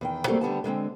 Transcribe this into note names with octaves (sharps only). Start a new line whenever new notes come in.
E2 D#3 G5
F#3 G3 A3 A#3 C4
D3 G3 B3 A5
D3 G#3 A#3 C4